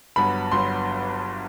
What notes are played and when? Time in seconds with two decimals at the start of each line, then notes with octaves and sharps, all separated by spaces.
0.16 G1 G2 F#3 B3 B5
0.51 G1 G2 F#3 B3 C6